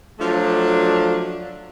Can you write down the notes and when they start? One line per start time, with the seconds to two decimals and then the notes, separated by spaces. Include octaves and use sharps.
0.20 F3 F#3 A3 D4